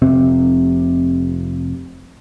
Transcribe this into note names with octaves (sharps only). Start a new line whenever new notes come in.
F1 C3 C4